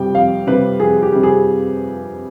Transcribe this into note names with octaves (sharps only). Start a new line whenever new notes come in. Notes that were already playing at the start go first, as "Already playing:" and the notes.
Already playing: F2 C3 G3 G5
F2 F5
C3 G3 B4
F2 G#4
G4
C3 G3
G#4